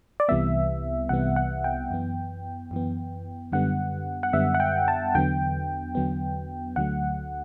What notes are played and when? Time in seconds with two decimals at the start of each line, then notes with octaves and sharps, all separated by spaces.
0.20 D5
0.29 C2 C3 E3 G3 B3 E5
1.09 C2 C3 E3 G3 B3 F#5
1.36 F#5
1.64 G5
1.90 F#2 E3 B3
2.71 F#2 E3 B3
3.52 F#2 D3 G3 B3 F#5
4.23 F#5
4.33 F#2 D3 G3 B3 E5
4.55 F#5
4.60 G5
4.88 A5
5.15 E2 D3 F#3 B3 G5
5.95 E2 D3 F#3 B3
6.76 D2 D3 F#3 A3 F#5